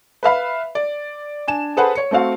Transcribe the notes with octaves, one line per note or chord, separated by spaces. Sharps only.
B4 E5 F5 B5
D5
D4 G#5 E7
G#4 A4 B4 C5 F#5 B5
C#5 C#7
A3 C4 F#4 F5